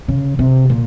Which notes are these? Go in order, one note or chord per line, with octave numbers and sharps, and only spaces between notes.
C#3
C3
A#2